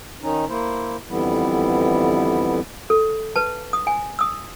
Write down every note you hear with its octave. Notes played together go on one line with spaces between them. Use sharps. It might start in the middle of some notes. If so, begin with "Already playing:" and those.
D#3 C#4 D#4
A#3 E4 C5
F2 D3 E3 G3 B3 E4
A4
B4 A5
D#6
G#5
D#6 E6